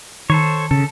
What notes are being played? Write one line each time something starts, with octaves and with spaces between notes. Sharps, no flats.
D#3 A4 C5 C#5
C#3 A4